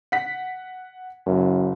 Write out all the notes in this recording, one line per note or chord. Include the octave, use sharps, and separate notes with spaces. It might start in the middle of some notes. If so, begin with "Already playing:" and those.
F#5 B6
F#1 F#2